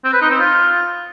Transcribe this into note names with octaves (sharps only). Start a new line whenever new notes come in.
C4
B4
D#4
C4
F4